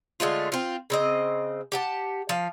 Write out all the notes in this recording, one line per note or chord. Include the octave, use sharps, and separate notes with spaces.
D3 G#3 A3 F4
C4 F4
C#3 C4 D#5
G4 F#5 A5
F3 F5